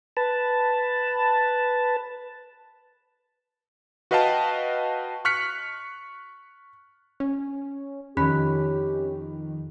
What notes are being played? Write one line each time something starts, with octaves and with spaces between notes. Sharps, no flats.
B4 A5
F#4 B4 D#5 F5 G5 A5
C#6 F6 F#6 B6 C#7
C#4
F2 D#3 C#4 G4 B5 F#6 B6